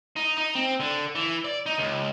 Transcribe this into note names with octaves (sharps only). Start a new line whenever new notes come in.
D#4
D#4
C4
D3
E3
D5
D#4
C#2